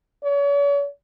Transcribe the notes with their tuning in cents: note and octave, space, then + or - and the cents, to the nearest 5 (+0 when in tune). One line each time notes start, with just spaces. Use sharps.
C#5 +40